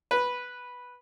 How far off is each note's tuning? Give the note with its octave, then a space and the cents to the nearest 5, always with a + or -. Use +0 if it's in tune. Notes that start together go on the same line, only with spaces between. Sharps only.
B4 -5